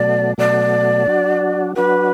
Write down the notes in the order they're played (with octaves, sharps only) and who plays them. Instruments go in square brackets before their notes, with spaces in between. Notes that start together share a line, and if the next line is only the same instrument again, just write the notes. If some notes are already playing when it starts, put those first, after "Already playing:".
Already playing: [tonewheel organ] B2 F#3 A3 [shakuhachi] D5
[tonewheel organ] B2 F#3 A3 [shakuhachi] D5
[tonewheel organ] F#3 D4 F#4
[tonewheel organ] F#3 D4 F#4 [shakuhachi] B4